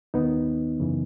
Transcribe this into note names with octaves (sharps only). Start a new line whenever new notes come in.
D#2 D#3 B3 D#4
F#2 C#3 E3